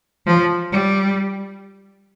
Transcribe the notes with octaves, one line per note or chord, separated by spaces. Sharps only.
F3
G3